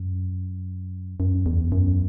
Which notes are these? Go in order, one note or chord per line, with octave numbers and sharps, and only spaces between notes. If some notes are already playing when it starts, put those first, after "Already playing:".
Already playing: F#2
F#2
E2
F#2